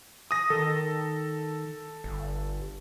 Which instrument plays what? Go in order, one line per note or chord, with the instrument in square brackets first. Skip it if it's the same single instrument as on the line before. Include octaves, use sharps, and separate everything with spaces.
[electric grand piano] D#6 A#6
[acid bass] D#3 [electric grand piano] A4
[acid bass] G1